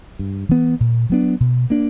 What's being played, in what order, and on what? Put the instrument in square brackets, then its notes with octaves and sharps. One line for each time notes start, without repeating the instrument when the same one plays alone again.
[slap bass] G2
E3 B3
A#2
F#3 B3 D4
B2
A#3 D4